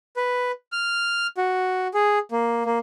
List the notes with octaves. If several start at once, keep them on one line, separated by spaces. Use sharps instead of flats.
B4
F6
F#4
G#4
A#3
A#3